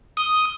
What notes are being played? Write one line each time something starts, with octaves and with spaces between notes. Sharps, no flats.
D#6